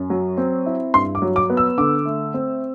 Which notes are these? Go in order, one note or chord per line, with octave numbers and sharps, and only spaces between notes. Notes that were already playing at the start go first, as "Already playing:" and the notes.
Already playing: F#2
F#3
C4
E4
G2 C6
D6
F#3
D6
B3
E6
D3 D6
A3
C4